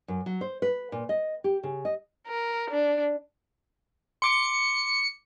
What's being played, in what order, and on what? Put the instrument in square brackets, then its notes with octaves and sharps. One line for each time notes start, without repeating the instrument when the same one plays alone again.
[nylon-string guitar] F#2
F#3
C5
B4
A#2
D#5
G4
C#3
D#5
[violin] A#4
D4
[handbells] C6 D6 D7 [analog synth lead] C#7